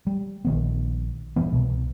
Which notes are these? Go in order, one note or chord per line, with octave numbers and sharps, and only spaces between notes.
G3
A#1 D#3 B3
D#1 G2 E3 B3
C2 B2